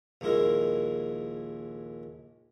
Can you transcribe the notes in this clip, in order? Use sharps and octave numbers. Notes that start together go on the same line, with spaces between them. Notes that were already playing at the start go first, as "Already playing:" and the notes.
A#1 D#2 G#3 E4 A#4